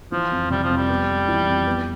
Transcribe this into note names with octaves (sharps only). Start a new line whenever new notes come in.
E3 F3
F2
C3 G3
F3
F2
G3
B3
F2
E3
F2
B3